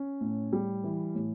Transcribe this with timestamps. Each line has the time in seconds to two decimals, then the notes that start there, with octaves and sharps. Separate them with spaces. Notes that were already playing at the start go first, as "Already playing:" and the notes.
Already playing: C#4
0.21 A2
0.53 G3
0.84 E3
1.15 A2